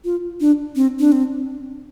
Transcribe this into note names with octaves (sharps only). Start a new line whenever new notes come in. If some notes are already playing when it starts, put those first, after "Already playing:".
F4
D4
C4
D4
C4